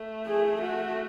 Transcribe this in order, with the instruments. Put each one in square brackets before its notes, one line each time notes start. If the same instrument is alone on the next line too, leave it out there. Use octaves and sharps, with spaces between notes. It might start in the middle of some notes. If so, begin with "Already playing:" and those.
Already playing: [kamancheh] A3
[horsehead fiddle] G#4
F#4